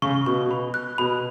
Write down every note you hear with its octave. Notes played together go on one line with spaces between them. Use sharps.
C#3 C#6
B2 C#6
B5
F#6
B2 B5